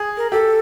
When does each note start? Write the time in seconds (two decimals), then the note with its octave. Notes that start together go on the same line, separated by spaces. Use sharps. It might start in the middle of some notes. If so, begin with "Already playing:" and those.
Already playing: G#4
0.17 A#4
0.31 G4 A4